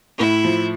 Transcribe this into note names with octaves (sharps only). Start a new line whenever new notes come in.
A2 E4
F3